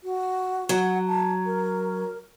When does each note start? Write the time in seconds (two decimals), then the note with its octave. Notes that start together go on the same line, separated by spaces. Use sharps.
0.04 F#4
0.69 F#3 F#5
1.08 A5
1.46 A#4